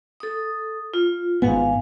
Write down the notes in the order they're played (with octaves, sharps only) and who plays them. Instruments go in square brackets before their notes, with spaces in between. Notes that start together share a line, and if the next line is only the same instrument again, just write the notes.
[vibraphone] A4 D#6
F4
[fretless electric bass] G#1 G#2 B3 [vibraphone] F5 G#5